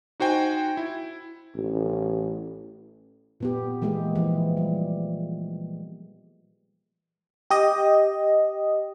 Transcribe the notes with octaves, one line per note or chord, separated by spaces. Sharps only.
D#4 F#4 C5 G5 G#5
E4
A1
A#2 B3 G4
E3 G#3 A#3 G4 G#4
E3 F3
G3
G4 D#5